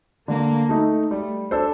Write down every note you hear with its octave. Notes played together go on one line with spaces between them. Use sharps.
D3 A#3
A3 D#4
G3 A3
D4 A4 C5